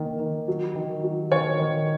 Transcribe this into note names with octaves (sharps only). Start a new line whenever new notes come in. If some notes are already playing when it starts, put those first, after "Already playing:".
Already playing: D#3 A#3
D#3
F#3
D#3
F#3
D#3 C#5
D#3